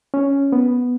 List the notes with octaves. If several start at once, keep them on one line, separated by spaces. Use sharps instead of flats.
C#4
B3